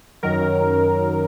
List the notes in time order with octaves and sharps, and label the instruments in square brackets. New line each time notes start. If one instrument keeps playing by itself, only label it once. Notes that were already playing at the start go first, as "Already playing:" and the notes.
[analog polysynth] F#2 D#3 F#3 A#4